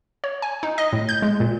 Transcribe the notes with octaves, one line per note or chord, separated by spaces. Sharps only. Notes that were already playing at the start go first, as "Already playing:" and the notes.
C#5
G#5
D#4
D#5
A2
G6
G#3
A#2